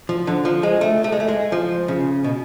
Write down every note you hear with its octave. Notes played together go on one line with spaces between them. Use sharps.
F3
D3
F3
G#3
A3
A3
G#3
A3
G#3
F3
C#3
B2